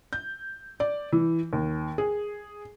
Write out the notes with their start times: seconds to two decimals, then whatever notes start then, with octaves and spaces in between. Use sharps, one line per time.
0.13 G6
0.80 D5
1.12 E3
1.53 D#2
1.98 G#4